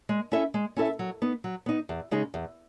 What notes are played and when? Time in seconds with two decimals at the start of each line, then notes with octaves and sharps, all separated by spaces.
0.09 G#3
0.32 C#4 E4 A4 E5
0.54 G#3
0.77 C#4 E4 A4 E5
0.99 F#3
1.22 B3 D#4
1.44 F#3
1.66 B3 D#4
1.89 E2
2.11 C#3 G#3 D#4 G#4
2.34 E2